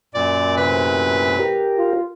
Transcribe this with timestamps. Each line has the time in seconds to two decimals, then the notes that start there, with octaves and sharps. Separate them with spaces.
0.15 F#2 A#2 D5
0.57 A2 C3 B4
1.39 G4 A#4
1.78 F4